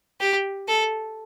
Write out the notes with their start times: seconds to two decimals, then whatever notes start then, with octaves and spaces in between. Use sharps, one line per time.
0.20 G4
0.68 A4